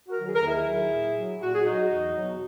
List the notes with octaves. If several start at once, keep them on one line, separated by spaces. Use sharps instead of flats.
F#4 A#4
D#3 F#3
G#4
A#4
D#2 E4 G#4
D#3 F#3
A#2
F#3
A#2 F#4
G#4
F#3 D#4 F#4
E2
B2 F#3